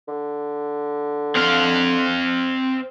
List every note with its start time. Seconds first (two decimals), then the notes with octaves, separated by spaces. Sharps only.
0.08 D3
1.36 C4 F5